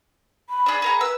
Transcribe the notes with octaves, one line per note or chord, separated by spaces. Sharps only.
B5
D4 G#4
G#4 A#4 F#5
B4 E6